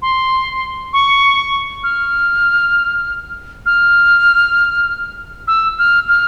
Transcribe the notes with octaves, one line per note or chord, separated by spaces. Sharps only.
C6
C#6
F6
F6
E6
F6
F6